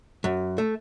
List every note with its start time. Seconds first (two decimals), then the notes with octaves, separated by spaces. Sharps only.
0.24 F#2
0.58 A3